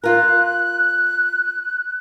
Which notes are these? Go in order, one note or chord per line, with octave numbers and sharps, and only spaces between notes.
F4 A#4 F#6